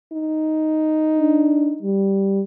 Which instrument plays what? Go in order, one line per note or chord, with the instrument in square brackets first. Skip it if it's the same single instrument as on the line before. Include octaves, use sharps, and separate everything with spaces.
[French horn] D#4
[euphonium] D4
G3